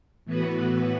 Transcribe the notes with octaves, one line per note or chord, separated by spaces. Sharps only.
A2 E3 B3 F#4 B4